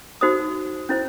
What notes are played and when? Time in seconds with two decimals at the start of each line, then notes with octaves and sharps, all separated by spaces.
0.21 D#4 F#4 C5 D#6
0.89 C#4 E4 C5